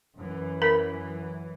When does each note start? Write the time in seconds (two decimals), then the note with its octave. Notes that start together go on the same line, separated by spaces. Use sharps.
0.16 F#2 E3
0.62 A#4 B5